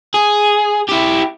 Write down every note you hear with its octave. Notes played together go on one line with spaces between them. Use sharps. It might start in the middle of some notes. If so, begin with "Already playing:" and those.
G#4
E4 G4